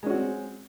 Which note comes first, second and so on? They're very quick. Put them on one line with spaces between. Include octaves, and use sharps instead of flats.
G#3 C#4 F#4 C4